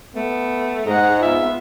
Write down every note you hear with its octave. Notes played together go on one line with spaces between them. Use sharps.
A3 B3
G#2 G#3 F#5 A#5
B3 F4 E5